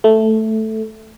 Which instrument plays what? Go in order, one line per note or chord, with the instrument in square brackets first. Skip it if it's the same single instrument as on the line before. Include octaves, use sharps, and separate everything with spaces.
[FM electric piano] A3